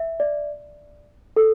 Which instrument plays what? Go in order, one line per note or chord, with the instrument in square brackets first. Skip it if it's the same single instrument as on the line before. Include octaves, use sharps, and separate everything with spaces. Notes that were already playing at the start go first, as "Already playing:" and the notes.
Already playing: [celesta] E5
D5
A4